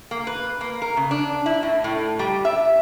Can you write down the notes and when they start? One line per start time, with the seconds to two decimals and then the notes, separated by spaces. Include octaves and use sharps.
0.11 A#3
0.27 B4
0.61 A#3
0.82 A#4
0.97 C#3
1.11 D4
1.46 E4
1.63 A2
1.84 A2
2.19 G3
2.45 E5